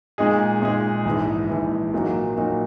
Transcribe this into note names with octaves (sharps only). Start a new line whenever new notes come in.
A#2 G#3 D#4 G#4
A#2 G#3 D#4 G#4
A#1 G#2 E3
A#1 G#2 E3
A#2 F#3 A#3 D#4
A#2 F#3 A#3 D#4